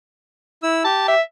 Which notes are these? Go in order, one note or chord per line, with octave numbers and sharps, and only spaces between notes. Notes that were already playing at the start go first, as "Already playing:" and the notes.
E4 E6
G4 A5
E5